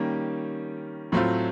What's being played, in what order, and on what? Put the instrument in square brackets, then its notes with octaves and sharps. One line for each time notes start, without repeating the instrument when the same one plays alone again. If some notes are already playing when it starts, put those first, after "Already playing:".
Already playing: [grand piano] D#3 G3 A#3 C#4
A2 F#3 A3 C4 F4